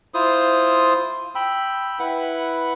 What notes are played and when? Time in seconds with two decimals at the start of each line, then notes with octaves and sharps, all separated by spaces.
0.14 E4 F4 C5 D#6
1.35 G5 B5 E6
1.99 E4 B4 F#5